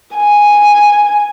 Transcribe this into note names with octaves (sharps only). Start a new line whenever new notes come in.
G#5